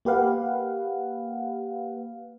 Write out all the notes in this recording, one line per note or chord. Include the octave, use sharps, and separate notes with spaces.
A#3 G4 B4 F5 F#5